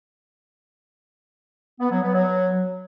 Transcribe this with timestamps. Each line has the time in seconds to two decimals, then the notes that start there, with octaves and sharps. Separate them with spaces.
1.80 B3
1.91 F#3
2.02 B3
2.13 F#3